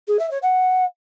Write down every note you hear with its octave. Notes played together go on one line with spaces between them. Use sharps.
G#4
E5
C#5
F#5